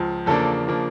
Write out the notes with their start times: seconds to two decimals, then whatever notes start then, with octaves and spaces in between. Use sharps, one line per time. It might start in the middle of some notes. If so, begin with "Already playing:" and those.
Already playing: C#2 F3
0.26 E2 C#3 F3 A#3 D4 A4
0.67 C#3 F3 A#3 D4